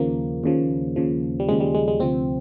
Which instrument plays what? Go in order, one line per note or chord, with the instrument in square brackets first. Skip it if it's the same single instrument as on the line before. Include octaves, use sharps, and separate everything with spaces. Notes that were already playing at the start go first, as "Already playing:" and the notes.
Already playing: [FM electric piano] D#2 C#3 F3 A#3
D#2 C#3 F3
D#2 C#3 F3
G3
D#2 C#3 F3 G#3
G3
G#3
G#3
D2 C3 F3 C4